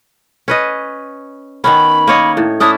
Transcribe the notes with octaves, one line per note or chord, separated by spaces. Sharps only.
C#4 B4 D#5
D#3 B3 C#4 B5
A#3 C#5 D#5
A2
C#4 D4 E4 D#6